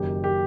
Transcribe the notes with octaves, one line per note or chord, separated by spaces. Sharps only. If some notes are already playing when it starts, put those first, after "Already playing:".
Already playing: F#1 F#2 D#3 G4
D#3 G4